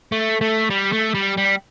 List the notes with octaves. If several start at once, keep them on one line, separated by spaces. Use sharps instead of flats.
A3
A3
G3
A3
G3
G3